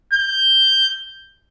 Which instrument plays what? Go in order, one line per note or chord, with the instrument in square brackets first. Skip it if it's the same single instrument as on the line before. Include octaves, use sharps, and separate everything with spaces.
[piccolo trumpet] G6